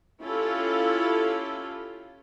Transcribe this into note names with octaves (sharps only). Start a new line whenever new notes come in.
C#4 E4 F4 G4 A4